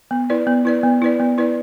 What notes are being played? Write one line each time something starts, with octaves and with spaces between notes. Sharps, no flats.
B3
E4 B4 D5
B3
E4 B4 D5
B3
E4 B4 D5
B3
E4 B4 D5